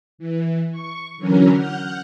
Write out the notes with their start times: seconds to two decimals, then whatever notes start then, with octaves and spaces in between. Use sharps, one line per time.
0.18 E3
0.71 C#6
1.17 D3 E3 F#3 C#4 A#4
1.55 F#5 F6 G6